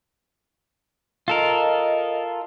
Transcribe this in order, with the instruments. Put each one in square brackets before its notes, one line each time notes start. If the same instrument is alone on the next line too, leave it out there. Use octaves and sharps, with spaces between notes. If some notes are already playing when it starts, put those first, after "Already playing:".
[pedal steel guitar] F4 A4 A#4 [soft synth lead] D#5